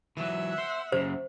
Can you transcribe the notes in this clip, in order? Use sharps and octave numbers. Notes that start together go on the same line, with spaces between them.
E3 F#3 E5 F#5
C5
F#2 C#3 C5